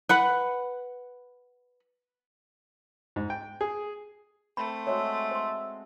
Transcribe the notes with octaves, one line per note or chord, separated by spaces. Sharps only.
B4 F#5 B5
G#2
G5
G#4
A3 C4 C5 B5
G#3 F#4 C#5 E5
C5 C6